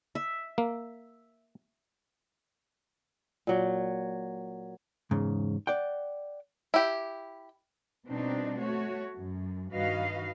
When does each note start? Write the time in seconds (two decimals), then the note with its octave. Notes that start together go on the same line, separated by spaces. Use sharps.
0.15 E5
0.58 A#3
3.47 A#2 F#3 G5
5.11 E2 G#2 C#3
5.67 D5 F#5 G5
6.74 E4 G4
8.07 B2 G3 C4 D4 D#4
8.57 A3 F#4 C#5
9.16 F#2
9.72 G2 D#3 F#4 B4 D#5 F5